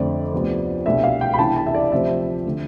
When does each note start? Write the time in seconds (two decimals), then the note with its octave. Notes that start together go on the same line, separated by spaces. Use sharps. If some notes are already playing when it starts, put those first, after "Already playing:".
Already playing: F2 D3 A3 C4 D5
0.33 D2 C3 F3 B3
0.86 C2 B2 A3 D4 E5
1.04 F5
1.21 G5
1.34 B5
1.39 C2 C3 E3 B3 D4 A5
1.56 A5
1.66 E5
1.74 D5
1.92 D2 C3 F3 C4 E5
2.45 D3 A3